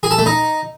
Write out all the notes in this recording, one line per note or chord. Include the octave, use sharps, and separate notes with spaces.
G#4
A4
A3
D#4